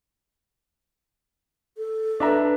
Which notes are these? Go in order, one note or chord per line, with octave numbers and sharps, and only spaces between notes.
A4
D4 B4 E5 A#5